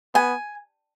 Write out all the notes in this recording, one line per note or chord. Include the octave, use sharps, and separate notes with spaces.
B3 G#5